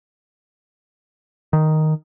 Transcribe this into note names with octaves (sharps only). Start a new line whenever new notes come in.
D#3